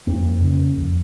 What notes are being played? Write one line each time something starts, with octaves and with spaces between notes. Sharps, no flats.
F2 A#3
C#3
F2